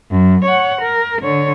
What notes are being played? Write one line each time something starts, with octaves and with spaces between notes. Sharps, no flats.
F#2
C#5 F#5
A#4
D3 C#5